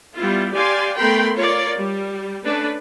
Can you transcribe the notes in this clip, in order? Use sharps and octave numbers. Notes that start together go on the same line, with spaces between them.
G3 B3 E4 F4
G4 D5 F5 G#5 C6
A3 B3 A#4 G5 B5 C6
F4 A#4 C#5 D5
G3
A3 C#4 D4 B4